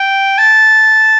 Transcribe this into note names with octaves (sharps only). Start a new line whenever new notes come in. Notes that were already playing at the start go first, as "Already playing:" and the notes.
Already playing: G5
A5